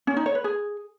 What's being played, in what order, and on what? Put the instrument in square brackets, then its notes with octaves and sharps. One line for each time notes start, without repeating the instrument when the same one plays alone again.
[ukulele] C#4
D#4
C#5
B4
G#4